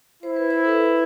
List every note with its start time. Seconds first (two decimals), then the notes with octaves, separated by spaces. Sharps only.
0.23 E4 C5
0.36 B4
0.50 C5
0.64 A4
0.69 B4